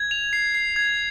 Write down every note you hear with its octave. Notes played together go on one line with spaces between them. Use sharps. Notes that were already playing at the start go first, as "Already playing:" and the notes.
Already playing: G#6
F7
C7
C7
G#6